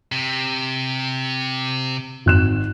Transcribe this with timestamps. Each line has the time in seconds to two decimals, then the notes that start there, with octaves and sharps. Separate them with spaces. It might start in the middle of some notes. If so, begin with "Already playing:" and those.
0.12 C3
2.26 G#1 F#6 E7